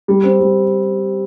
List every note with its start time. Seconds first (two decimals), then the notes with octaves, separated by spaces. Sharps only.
0.08 G3
0.24 C4
0.40 G3